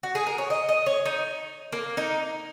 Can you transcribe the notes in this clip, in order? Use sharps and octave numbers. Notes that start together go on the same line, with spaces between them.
F#4
G#4
A#4
C#5
D#5
D#5
C#5
D#4
A#3
D#4